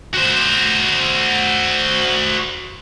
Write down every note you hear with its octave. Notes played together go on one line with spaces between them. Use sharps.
F#4 C5